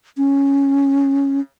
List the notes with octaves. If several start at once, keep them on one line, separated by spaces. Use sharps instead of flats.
C#4